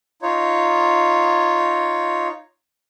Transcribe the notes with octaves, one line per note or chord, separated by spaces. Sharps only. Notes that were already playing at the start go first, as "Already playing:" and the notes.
D#4 F4 C#5